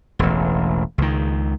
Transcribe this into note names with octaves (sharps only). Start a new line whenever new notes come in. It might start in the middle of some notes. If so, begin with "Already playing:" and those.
E1 A1
C#2 D#3